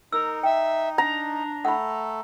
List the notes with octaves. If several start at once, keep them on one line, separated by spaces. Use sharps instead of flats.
D#4 A#4 E6
E5 G5
D4 A#5
A3 A4 F#5 B5